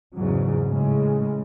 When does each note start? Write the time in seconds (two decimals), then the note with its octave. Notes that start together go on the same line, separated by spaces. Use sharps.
0.15 E2 G#2 C#3 F#3
0.68 A2 C#3 G#3